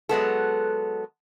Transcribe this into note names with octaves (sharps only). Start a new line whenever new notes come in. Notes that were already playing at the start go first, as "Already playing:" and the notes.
F#3 G#3 B3 A4